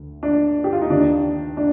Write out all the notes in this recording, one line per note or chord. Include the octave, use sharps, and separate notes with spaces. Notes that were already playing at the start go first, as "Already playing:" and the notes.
Already playing: D2
D4
G4
F4
D#4
D#2 D#3 D4
D4